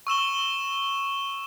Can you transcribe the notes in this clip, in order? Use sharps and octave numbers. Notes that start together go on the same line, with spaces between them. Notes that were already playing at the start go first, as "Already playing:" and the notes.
C#6 E6 E7 G7